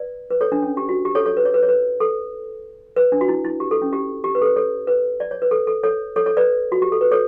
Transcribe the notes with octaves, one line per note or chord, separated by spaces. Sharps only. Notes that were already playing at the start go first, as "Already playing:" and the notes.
Already playing: B4 D5
B4
A4 C#5
D4
C#4
G4
F#4
G4
A4 C#5
A4 C#5
B4
C#5
B4
C#5
B4
A4
B4
D4
F#4
E4
E4
G4
A4
C#4
G4
G4
B4
A4
B4
A4 C#5
B4
D5
C#5
B4
A4
A4
A4 C#5
A4 C#5
A4 C#5
B4 D5
F#4
G4
A4
B4
A4 C#5